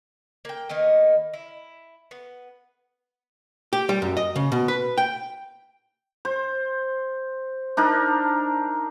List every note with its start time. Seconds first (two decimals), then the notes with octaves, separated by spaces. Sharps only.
0.45 A#3 G5
0.69 D#3 A#3 B3 D#4
1.34 E4
2.11 B3
3.73 G4
3.89 G3
4.02 F#2
4.17 D#5
4.36 C#3
4.52 B2
4.68 B4
4.98 G5
6.25 C5
7.77 D4 D#4 A#4